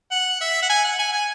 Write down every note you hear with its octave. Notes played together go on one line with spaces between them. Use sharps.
F#5
E5
F#5
G#5
F#5
G#5
G#5